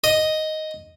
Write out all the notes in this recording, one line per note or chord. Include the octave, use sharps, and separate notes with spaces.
D#5